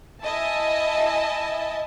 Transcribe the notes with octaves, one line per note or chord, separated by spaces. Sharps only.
E4 D#5 E5 G#5 A5